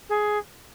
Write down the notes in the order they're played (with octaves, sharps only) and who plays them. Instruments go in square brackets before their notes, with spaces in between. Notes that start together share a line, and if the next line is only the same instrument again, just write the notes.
[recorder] G#4